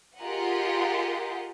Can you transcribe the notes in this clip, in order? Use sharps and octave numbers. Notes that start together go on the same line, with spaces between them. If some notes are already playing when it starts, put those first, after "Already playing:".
F4 G4 G#4 A#4 D#5 F#5